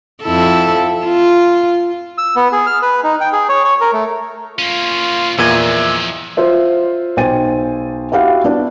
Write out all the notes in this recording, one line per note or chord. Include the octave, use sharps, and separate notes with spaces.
F2 E4 A4
F4
E6
B3
G#4
F6
B4
D#4
G5
G#4
C#5
C#5
A#4
A3
A#3 C#4 F4
E2 A#2 F3 D#5 E5 G#6
F4 C5 E5
B1 C5 G5 G#5 A6 D#7
E4 F#4 G4 F5 F#5
B3 D4 E4